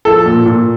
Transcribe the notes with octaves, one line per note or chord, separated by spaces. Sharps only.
F3 A4
A#2
A#2